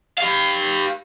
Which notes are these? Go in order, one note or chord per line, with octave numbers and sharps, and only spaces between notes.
G4 F5